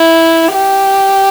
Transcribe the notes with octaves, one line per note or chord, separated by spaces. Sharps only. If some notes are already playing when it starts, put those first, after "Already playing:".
Already playing: E4
G4